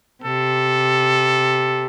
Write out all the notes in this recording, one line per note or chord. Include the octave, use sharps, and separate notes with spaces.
C3 A4